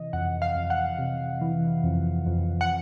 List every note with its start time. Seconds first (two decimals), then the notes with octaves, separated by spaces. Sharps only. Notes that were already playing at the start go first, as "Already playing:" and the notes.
Already playing: C3 E3 D#5
0.13 F2 F#5
0.42 F5
0.56 F2
0.70 F#5
0.99 C3
1.41 E3
1.84 F2
2.26 F2
2.61 F#5